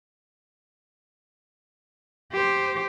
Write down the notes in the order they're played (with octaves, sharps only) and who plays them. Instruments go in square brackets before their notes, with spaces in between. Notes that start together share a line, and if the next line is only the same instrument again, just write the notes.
[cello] G4 C5